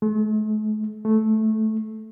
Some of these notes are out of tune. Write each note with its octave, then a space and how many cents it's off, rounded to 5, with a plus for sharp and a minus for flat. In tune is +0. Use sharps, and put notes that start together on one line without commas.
A3 -45
A3 -10